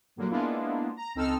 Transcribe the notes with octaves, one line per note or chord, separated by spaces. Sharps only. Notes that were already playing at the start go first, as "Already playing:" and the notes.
G2 A#2 D3 F#3 A#3
G#3 A#3 B3 D4 E4 F4
A#5
C#2 C4 D#4 A4 E6 F6